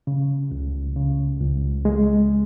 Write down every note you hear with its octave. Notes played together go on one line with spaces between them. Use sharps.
C#3
C#2
C#3
C#2
G#3